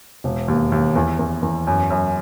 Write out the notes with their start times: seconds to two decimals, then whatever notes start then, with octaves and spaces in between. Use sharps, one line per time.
0.24 E1
0.48 D#2
0.72 D#2
0.95 E2
1.19 E2
1.43 E2
1.67 F#2
1.90 F#2